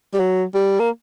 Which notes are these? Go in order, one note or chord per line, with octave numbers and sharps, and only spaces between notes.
G3
F#3
G3
A#3